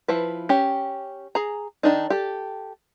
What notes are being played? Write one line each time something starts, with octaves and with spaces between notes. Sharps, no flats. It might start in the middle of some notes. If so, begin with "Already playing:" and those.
F3 E4 B4
C#4 G4
G#4 A#5
D#3 D4 D#4
G4 A4